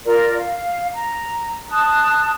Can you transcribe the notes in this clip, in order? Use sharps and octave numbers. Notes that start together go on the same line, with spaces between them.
F4 A#4 D5
F5
A#5
A5 D#6 F#6